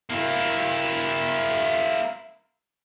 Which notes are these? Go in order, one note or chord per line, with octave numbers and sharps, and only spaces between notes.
A#3 E4